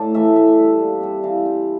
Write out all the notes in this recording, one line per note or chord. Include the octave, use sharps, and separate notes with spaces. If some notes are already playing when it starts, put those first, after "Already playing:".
Already playing: A2 D5 A5
E3 A3 E5
E3 E5
G3 D4
A#2
G3 C4
E3 F5
G3 C4